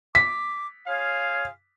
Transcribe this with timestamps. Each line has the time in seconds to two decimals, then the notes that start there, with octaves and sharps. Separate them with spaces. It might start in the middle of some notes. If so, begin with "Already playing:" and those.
0.15 D6 B6
0.87 F4 G#4 C#5 F5